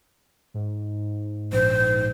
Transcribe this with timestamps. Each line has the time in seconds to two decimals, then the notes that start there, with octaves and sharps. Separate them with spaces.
0.54 G#2
1.53 A#1 C5